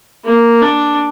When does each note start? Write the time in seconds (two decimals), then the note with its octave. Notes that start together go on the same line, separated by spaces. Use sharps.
0.24 A#3
0.61 D4